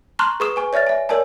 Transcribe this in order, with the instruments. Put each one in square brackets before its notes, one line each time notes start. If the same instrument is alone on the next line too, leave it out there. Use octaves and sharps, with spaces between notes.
[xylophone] A5 A#5 C6 C#6 F6 F#6
G#4 B4 C#6 D#6 E7
B4 G#5 C#6
C#5 D5 E5 F6 A6
E5 G#5
A#4 C#5 D5 G#5 A5